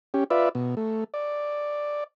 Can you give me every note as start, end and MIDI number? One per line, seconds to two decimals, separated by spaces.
0.14 0.24 61
0.14 0.24 67
0.30 0.49 65
0.30 0.49 71
0.30 0.49 74
0.30 0.49 76
0.55 0.75 47
0.77 1.04 57
1.14 2.04 74